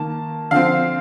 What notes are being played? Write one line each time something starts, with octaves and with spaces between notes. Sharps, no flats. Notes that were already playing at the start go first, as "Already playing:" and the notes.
Already playing: D#3 A#3 A5
D3 F3 C4 F5